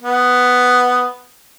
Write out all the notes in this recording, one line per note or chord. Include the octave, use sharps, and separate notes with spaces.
B3